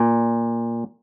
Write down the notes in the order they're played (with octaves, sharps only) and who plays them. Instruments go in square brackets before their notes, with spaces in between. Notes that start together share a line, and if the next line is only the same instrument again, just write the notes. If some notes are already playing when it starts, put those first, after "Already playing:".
Already playing: [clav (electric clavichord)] A#2